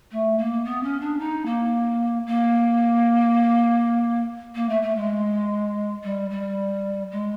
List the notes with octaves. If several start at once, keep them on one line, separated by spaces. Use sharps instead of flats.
A3
A#3
B3
C#4
D4
D#4
A#3
A#3
A#3
A3
A3
G#3
G3
G3
G#3